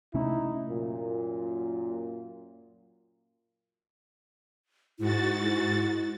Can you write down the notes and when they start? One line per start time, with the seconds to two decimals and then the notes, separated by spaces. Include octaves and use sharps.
0.14 A#1 C3 A3 C#4 D#4 E4
0.70 F#2 A#2
4.99 G#2 E4 F#4 A6